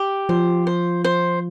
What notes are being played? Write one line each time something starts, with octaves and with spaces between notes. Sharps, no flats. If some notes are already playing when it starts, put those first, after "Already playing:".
Already playing: G4
F3 C5
C5
C5